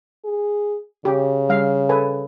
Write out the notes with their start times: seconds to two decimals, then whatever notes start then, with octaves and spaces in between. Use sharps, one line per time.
0.24 G#4
1.05 C#3 G4
1.49 G3 F5
1.89 A4 B4 G#5